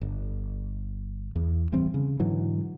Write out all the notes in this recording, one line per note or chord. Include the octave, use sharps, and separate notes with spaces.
G1
E2
D1 E3 G3 C4
C#3
G#2 D3 E3 F#3